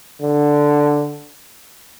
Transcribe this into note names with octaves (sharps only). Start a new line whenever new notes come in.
D3